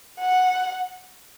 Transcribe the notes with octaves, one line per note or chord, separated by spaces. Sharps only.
F#5